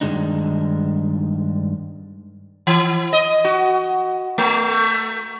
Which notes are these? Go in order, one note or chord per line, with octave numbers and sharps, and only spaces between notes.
G2 D#3 G#3 D4 D#4
E3
D#5
F#4
A3